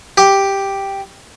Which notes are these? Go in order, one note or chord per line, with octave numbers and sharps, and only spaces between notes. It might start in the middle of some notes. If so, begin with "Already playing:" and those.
G4